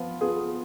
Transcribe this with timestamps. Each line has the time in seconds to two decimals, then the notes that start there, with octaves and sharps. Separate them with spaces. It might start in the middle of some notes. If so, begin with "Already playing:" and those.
Already playing: F3 B3 F4
0.21 B3 F4 G#4